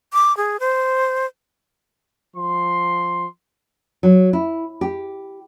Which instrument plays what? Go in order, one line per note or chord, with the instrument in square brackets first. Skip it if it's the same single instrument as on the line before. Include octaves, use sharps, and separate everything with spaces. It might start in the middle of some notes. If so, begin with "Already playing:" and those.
[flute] D6
G#4
C5
[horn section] F3 C6
[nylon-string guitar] F#3
E4
G4